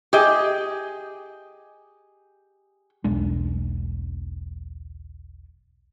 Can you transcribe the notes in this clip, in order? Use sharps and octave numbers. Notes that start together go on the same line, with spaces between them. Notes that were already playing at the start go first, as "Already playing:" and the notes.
G4 G#4 D#5
E1 B1 G#3 D4